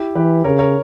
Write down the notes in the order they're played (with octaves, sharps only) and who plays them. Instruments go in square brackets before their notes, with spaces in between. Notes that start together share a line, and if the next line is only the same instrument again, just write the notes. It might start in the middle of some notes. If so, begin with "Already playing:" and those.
Already playing: [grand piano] E4 G4
[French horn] E3 [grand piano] G4 B4
[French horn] C#3 [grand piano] A#4 C#5
[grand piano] A#4 C#5